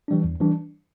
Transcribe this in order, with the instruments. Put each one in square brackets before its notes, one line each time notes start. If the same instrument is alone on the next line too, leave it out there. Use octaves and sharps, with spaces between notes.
[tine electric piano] E3 G3 D4
E2
E3 G3 D4